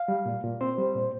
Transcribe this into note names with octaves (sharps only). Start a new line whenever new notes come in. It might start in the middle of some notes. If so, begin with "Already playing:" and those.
Already playing: F5
G3
A#2
A#2
C4 C5
G3
A#2